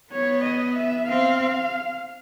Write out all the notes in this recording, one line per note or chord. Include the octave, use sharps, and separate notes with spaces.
B3 C#5
D#5
E5
C4 F5